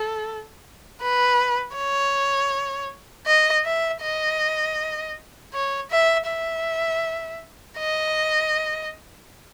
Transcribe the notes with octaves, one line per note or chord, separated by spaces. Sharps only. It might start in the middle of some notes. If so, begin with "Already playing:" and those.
Already playing: A4
B4
C#5
D#5
E5
D#5
C#5
E5
E5
D#5